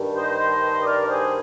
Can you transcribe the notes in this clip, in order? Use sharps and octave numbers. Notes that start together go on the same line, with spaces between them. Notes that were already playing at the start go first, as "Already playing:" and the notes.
Already playing: G2 D#3
C5 D#5
D#5
A#4 D5
G#4 C5